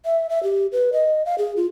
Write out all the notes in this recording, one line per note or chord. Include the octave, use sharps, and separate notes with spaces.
E5
E5
G4
B4
D#5
F5
G#4
F4